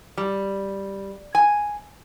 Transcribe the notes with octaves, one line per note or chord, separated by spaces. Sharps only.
G3
G#5